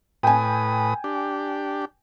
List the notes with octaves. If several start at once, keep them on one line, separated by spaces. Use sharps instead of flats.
A2 B4 G5 G#5 D#6
D4 G4